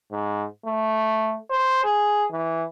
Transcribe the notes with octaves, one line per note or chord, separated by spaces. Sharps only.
G#2
A3
C5
G#4
E3